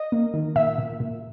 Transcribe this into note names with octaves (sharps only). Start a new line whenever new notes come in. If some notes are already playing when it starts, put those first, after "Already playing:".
Already playing: D#5
A#3
D#3
A#2 E5
A#2
A#2